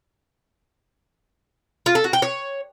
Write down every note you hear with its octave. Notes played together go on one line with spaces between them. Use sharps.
F4
A4
F#4
G5
C#5